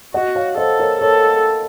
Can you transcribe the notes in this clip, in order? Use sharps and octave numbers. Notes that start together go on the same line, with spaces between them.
F#4 D#5 F#5
C#5 F5
A4 C5 D#5
A#4 C#5
A4 A#4 C#5